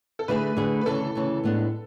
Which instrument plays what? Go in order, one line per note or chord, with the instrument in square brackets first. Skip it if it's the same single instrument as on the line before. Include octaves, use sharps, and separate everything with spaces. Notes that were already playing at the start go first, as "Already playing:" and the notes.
[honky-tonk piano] A4
[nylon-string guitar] D3 A3 E4 G#4 [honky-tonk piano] B4
[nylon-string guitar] D3 A3 E4 G#4
[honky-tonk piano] B4
[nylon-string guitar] D2 C#3 E3 [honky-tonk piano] A4
[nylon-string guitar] D2 C#3 E3
A2 G#3 B3 D4